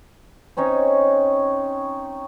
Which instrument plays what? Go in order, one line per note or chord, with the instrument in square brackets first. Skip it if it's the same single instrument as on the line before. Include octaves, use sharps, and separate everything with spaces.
[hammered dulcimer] C4 C#4 D#4 C#5